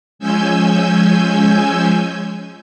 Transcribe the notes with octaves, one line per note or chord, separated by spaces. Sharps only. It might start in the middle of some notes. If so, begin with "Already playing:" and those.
F3 G#3 C#4 G#5 E6 G6